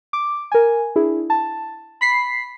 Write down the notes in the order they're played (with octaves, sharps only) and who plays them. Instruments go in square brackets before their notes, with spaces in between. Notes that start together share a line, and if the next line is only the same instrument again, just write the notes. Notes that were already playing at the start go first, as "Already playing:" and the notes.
[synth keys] D6
A#4 G#5
D4 E4 G#4
A5
B5 B6 C7